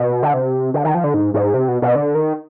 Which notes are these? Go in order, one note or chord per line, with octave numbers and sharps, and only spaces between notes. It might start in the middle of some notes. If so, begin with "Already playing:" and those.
Already playing: B2
D3
C3
D3
D#3
F3
D3
G#2
G#2
C3
B2
B2
D3
D#3